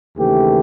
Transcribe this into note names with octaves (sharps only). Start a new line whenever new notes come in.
D#2 C#3 E3 A3 G4